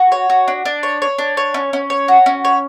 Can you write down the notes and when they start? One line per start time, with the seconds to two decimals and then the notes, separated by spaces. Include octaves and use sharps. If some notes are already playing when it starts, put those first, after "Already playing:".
Already playing: F#4
0.12 C#5
0.30 F#4
0.48 D4
0.65 D4
0.83 C#5
1.02 C#5
1.19 D4
1.37 C#5
1.54 C#4
1.73 C#4
1.90 C#5
2.08 F#4
2.26 C#4
2.45 C#5